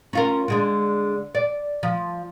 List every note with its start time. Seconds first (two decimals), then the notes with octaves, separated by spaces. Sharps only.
0.13 C#4 F4 A#4
0.48 D3 G#3 D4
1.35 D5
1.83 F3